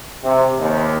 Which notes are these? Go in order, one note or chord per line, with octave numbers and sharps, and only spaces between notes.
C3
D#2